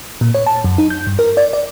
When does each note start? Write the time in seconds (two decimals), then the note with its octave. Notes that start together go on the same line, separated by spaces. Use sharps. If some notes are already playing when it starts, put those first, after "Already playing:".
0.21 A#2
0.34 C#5
0.46 A5
0.64 F#2
0.78 D#4
0.90 G6
1.07 G2
1.19 A#4
1.37 D5
1.53 D5